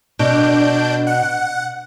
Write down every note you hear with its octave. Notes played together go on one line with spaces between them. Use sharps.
B2 D4 G6 D7
F#5